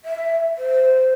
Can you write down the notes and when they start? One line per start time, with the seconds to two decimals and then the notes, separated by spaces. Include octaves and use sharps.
0.05 E5
0.58 C5